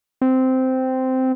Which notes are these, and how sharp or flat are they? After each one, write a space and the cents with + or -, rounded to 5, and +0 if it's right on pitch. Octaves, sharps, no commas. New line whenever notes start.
C4 -10